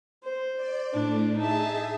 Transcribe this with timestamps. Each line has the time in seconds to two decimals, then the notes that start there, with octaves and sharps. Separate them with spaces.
0.24 C5
0.56 D5
0.93 A2 D4
1.37 D#4 G#4 E5 A5